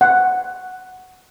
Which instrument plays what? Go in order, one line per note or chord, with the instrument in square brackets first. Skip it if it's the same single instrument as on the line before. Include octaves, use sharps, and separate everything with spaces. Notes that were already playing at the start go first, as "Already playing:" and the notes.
[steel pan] F#5